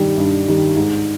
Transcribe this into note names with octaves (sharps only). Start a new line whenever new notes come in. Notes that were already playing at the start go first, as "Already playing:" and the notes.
Already playing: G2 D#3 G3
G2
D#3 G3
G#2